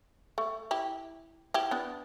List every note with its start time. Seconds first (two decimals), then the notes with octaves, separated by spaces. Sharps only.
0.38 A3
0.71 E4 G4
1.54 E4 G4
1.71 B3 D4